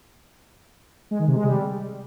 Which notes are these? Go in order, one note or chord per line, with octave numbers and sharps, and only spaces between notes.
G#3
D#3
C3
G#3
G3